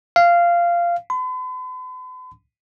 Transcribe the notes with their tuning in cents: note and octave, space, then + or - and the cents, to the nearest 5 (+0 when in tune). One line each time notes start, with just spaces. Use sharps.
F5 -15
B5 +45